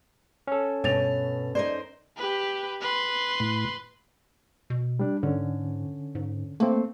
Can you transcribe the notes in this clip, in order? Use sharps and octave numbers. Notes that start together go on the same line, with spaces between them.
C#4 A4
G2 B2 C#5 A6 F7
D#4 A#4 C5 D5
G4 B4
B4 C6
A2
B2
G3 D4
G#2 D3 C#4
G#2
A3 A#3 C4